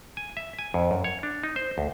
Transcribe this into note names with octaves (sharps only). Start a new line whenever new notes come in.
G#5
E5
G#5
F2
F#2
C#5
D4
D#4
C5
D2